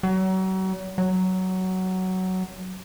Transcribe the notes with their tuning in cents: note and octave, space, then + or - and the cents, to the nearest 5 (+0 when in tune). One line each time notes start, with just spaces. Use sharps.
F#3 +35
F#3 +10